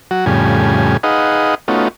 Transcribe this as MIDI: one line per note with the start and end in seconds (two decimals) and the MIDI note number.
0.11 0.25 54
0.11 0.25 66
0.26 0.97 41
0.26 0.97 45
0.26 0.97 49
0.26 0.97 55
0.26 0.97 80
1.03 1.55 63
1.03 1.55 68
1.03 1.55 71
1.03 1.55 75
1.03 1.55 77
1.03 1.55 78
1.68 1.88 57
1.68 1.88 59
1.68 1.88 61
1.68 1.88 63
1.68 1.88 65
1.68 1.88 66